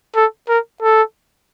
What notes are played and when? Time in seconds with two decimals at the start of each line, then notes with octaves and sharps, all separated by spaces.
0.16 A4
0.49 A#4
0.82 A4